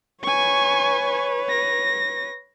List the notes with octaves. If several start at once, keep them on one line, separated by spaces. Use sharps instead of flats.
B4 C#5 G#5 C#6
A#6